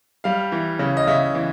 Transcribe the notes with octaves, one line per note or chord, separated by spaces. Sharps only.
G3 F5
E3
C#3
D#5
C#3 E5
E3